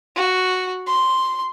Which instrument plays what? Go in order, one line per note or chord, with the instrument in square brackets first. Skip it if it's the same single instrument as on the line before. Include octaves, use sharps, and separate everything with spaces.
[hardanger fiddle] F#4
C6